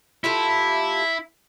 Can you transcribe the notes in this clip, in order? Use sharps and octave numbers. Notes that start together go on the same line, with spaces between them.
A3 E4 F4 G4